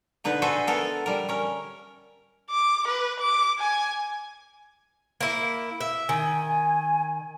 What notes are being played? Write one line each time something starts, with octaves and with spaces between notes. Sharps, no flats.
B2 D3 D#4 B4
F#4 G#4 A4 B4 C5 E5
B3 A4 A#4
G3 A#4
C#4 A#4
D6
B4
D6
G#5
A#3 E4
E5
D#3 G#5